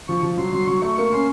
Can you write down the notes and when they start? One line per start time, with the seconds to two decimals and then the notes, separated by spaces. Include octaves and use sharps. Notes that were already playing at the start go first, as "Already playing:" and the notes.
0.08 F3 C#6
0.23 F3
0.37 F#3 C6
0.53 F#3 C6
0.67 F#3 C#6
0.82 A3 C#6
0.97 A#3 C#6
1.13 C#4 C6